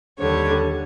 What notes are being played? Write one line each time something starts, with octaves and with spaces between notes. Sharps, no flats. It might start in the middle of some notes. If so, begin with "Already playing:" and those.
D#2 D3 G3 C#5